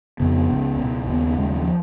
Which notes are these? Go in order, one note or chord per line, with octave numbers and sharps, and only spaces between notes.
F2 C#3 B3
C#2 C#3
C#2 B2
D#2 C#3 B3
D#2 C#3 G#3
F#3
F3